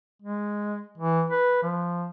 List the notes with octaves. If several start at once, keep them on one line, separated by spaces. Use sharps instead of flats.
G#3
E3
B4
F3